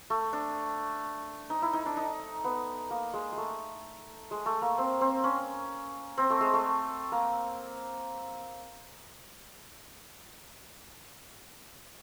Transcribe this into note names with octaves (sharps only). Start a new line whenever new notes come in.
A3
D4
D#4
E4
D#4
D4
D#4
B3
A#3
G#3
G#3
A3
G#3
A3
A#3
C4
C4
C#4
C4
A3
G#3
A3
A#3